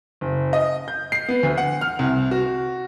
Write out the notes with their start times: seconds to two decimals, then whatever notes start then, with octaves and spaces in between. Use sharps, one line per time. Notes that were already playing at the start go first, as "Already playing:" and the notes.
0.21 F#1
0.53 D#5
0.88 G6
1.12 C7
1.29 B3
1.43 D2
1.58 F#5
1.81 F6
1.99 C2
2.31 F#4